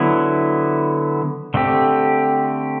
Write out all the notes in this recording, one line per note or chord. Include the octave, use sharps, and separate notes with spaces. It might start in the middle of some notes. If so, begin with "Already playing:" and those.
Already playing: D3 F#3 B3 E4
D3 A3 C4 G4